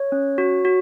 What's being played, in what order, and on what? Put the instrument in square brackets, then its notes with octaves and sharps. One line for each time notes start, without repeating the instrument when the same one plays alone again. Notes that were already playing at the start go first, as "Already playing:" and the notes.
Already playing: [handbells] C#5
C#4
F#4
F#4